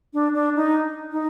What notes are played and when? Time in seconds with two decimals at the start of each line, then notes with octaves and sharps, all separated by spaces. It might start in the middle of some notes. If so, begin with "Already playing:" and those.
0.14 D4
0.34 D4
0.56 D#4
1.12 D#4